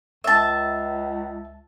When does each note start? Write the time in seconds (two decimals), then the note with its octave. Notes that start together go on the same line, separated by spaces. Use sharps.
0.24 C#2 E5 A5